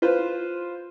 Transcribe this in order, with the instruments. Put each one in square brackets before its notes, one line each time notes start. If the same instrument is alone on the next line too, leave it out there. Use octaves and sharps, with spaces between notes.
[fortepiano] F4 B4 C5